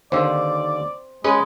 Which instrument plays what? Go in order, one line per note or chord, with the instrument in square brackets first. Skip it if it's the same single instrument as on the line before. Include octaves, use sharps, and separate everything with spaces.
[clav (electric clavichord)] D#2 D3 [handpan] C5 [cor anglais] D5
[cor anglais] G#3 [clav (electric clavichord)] C#4 B4 D#5 [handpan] G#4